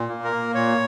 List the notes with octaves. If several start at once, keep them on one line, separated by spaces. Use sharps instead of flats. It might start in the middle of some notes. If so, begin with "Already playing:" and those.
Already playing: A#2
A#3
A#4
A#3
A#2 C#5